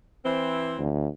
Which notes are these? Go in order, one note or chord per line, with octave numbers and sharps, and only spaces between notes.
E3 C4
D2